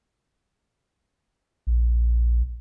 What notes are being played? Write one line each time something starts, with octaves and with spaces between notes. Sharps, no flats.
A#1